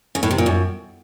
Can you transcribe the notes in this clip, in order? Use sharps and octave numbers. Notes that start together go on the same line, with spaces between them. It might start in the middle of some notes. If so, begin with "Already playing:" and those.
C#3
A2
C3
A#2
F#2